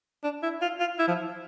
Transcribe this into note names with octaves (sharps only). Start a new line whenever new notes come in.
D4
E4
F4
F4
E4
F3